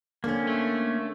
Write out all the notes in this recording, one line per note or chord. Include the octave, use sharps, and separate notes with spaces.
D3 A#3 C4 C#4
A3